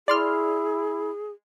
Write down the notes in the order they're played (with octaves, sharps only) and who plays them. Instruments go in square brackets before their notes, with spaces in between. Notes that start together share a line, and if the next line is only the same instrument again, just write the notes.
[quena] E4 [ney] G#4 [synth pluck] D5 C6 F6